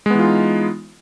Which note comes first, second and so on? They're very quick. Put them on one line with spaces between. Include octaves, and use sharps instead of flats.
G#3 B3 E3 F4 D#4